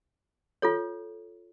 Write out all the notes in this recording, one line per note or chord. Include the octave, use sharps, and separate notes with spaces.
F4 A4 C#5